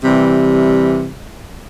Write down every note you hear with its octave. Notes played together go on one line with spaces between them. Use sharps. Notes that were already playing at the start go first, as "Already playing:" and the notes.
C3 E3 G3